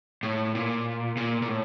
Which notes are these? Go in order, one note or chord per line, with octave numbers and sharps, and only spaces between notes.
A2
A#2
A#2
A#2
A2